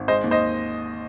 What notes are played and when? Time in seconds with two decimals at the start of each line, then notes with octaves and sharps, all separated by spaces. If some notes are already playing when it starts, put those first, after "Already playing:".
Already playing: G#1
0.08 G#3 C5 D#5
0.24 D#2
0.31 C5 D#5